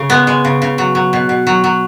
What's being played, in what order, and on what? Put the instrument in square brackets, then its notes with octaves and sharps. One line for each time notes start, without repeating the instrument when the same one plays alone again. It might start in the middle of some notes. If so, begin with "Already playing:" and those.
Already playing: [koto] C#3
G#3 B3
G#3
C#3
C#3
F#3
F#3
B2
B2
F#3
F#3